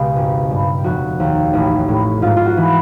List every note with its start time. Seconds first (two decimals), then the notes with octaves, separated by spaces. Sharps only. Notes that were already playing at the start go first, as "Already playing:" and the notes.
Already playing: C#2 B2 G4
0.16 G#1
0.51 G2
0.77 G4
0.84 F1 F#4
1.20 D#2
1.53 A1
1.89 A2
2.22 G#2 F4
2.36 F4
2.45 F#4
2.57 E3